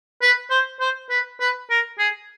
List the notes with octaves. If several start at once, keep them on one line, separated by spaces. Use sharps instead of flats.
B4
C5
C5
B4
B4
A#4
G#4